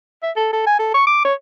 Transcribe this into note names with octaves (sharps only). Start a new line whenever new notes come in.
E5
A4
A4
G#5
A4
C#6
D6
C#5